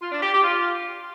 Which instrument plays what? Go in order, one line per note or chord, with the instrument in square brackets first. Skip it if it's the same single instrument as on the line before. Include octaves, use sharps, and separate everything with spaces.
[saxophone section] F4
D4
G4
G4
F4